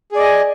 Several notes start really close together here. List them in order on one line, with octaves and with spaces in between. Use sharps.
G#4 D5 D#5 G#5